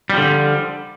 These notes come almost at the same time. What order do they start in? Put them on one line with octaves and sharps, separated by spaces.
G3 F3 D3